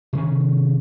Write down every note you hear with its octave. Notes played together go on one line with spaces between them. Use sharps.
C3 D#3 C#4